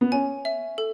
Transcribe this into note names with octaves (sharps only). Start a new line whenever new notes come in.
B3
C#4 G#5
E5
A4